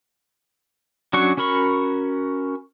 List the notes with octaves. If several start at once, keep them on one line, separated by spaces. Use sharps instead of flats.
F#3 C#4 D4 F#4 C#6
C#4 F#4 A#4 B5 C#6